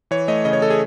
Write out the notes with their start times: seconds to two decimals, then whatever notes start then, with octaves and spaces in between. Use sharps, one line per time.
0.11 E3 C#5
0.28 A3 D#5
0.45 C#3 D#5
0.53 C#5
0.62 A4
0.70 G#4